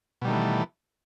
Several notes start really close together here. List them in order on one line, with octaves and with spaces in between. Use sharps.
B2 G3 D#3 A3 E3